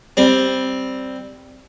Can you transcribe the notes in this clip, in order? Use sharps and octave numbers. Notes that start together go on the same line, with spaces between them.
G3 C4